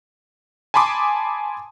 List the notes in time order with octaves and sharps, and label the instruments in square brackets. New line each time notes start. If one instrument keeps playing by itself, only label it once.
[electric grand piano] G#5 A5 B5 C6 D6 D#6